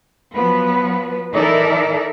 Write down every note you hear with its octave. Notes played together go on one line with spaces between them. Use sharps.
F3 F#3 B3 B4
E3 D#4 A4 A#4 D5 E5